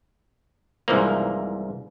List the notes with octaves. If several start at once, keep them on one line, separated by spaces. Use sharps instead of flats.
C2 G#2 E3 F3 A#3